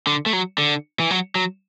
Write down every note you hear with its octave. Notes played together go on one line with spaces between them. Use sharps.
D3
A3
F#3
D3
E3
F#3
F#3